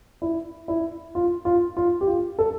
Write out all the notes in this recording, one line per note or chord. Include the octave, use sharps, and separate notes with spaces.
E4
E4
F4
F4
F4
G4
F4
A4